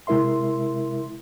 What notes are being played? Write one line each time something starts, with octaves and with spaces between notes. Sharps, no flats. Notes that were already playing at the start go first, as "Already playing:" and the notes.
C3 G#3 E4 A#4 E5 C6